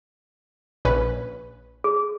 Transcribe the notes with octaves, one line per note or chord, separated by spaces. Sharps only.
A#1 C#4 B4
G#4